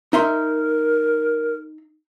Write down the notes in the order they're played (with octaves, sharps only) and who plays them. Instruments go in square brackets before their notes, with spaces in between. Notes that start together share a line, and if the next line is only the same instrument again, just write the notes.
[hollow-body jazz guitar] D#4 E5 C6 [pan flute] A#4